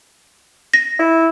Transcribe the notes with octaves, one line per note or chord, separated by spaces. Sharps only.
A#6
E4